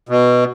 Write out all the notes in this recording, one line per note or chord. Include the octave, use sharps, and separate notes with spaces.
B2